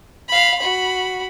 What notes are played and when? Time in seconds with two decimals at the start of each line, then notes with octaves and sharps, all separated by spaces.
0.28 F5 B5
0.59 F#4 B5